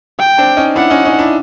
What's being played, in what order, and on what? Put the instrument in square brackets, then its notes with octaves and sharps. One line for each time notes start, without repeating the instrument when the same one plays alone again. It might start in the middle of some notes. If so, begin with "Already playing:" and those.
[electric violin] G5
[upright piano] C4 D4
C#4 D#4
[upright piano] D4 E4 [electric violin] F#5
[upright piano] C#4 D#4
C#4 D#4
D4 E4